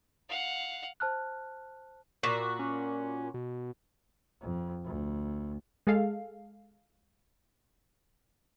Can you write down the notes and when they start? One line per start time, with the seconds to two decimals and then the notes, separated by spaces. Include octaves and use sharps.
0.29 F5 F#5
1.00 C5 A5 F6 F#6
2.23 A#2 F#4
2.59 C#4
3.34 B2
4.42 F2
4.85 D2
5.87 G#3 G#4 A4 F5